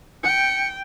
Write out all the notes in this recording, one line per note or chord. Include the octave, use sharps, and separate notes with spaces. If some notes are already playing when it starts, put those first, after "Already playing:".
G5 C#7